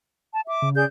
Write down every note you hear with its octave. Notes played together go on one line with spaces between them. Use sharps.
A5
E5 D6
C#3
G#4 D5 G6